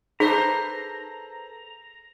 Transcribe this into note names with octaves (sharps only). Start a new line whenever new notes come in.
D#4 G#4 A4 B4 C5 A#5